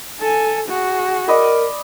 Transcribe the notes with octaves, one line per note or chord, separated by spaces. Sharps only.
A4 G#5
F#4 G#4
A#4 D5 D#5 B5